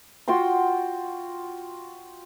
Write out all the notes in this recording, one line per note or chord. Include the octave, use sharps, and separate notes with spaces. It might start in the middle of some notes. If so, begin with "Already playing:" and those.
F4 F#4 G5 C6